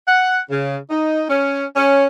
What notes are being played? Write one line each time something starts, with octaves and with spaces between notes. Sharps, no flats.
F#5
C#3
D#4
C#4
C#4